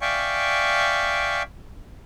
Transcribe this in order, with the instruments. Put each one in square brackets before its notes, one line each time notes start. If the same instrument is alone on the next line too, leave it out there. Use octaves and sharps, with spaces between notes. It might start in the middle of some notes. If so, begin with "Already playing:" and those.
[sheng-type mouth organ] D5 E5 F5 G5 G#5 C#6